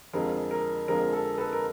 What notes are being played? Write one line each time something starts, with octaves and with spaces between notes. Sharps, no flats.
F2 D3 F3 G#3 A#4
A#4
F2 D3 F3 G#3 A#4
A4
A4 B4
A#4